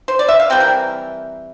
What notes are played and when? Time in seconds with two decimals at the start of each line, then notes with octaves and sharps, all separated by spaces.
0.08 C5
0.19 D5
0.28 E5
0.40 F5
0.50 E3 G3 C4 G5
0.60 A#4